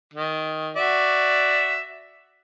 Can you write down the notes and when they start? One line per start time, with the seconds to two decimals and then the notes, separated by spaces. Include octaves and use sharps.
0.14 D#3
0.76 F#4 D5 E5